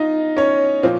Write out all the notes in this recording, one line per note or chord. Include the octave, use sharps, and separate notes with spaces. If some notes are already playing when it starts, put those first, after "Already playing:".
Already playing: D#4 F4 D#5
C#4 C#5
A#2 F3 C4